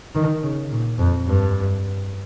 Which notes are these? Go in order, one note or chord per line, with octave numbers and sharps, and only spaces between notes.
D#3
C#3
A#2
F2
G2